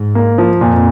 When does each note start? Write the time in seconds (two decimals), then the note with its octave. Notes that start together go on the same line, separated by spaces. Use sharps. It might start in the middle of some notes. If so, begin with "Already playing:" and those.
Already playing: G#2
0.15 A#3
0.38 F3
0.61 F2 A#2